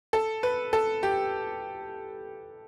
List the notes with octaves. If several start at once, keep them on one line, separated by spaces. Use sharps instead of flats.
A4
B4
A4
G4